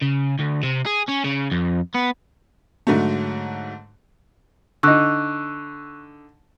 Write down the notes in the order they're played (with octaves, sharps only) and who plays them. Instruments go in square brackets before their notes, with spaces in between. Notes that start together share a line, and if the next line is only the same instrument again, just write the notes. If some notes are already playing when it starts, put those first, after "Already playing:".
[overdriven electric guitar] C#3
D2
C3
G#4
C#4
C#3
F2
B3
[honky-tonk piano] G#2 D3 F#3 A3
[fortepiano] D3 D#4 [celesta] C#6 E6 F#6